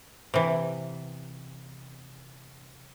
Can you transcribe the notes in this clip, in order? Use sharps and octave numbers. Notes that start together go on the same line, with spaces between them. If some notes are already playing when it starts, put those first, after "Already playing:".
C3 E3